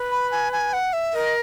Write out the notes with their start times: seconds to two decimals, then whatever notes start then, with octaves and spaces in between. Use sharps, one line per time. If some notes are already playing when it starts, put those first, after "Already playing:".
Already playing: B4
0.11 B5
0.31 G#5
0.52 G#5
0.73 F#5
0.93 E5
1.14 A#4 D#5